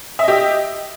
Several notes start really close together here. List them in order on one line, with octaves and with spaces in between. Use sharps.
E5 D#5 G4